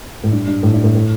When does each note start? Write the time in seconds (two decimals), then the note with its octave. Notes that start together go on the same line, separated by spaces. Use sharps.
0.24 A2
0.32 G2
0.47 G2
0.63 A2
0.74 G2
0.84 A2
0.95 A2